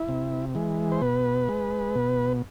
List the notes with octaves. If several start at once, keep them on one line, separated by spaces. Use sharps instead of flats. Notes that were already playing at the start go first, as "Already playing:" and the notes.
Already playing: E4
C3
E3 G#3
C5
B2 B4
G#3
B2